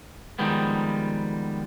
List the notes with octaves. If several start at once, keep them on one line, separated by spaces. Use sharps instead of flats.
D#3 F3 G3 G#3 B3